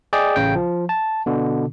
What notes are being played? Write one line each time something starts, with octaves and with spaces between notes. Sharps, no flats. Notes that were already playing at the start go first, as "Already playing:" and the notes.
G#4 D5 D#5 G5
A1 C#3 G5
F3
A5
B2 D3